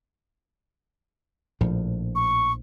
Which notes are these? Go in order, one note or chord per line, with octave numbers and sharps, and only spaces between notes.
A#1 A2 F3
C#6